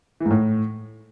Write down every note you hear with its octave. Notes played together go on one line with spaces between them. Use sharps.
E3
G#2
A2